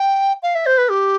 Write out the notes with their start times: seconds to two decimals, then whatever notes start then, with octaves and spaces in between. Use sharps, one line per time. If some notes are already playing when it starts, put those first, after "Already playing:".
Already playing: G5
0.43 F5
0.55 E5
0.66 C5
0.78 B4
0.90 G4